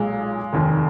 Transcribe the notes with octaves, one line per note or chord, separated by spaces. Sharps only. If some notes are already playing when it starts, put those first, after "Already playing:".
Already playing: B1 A#2 G#3
F1 D#2 D#3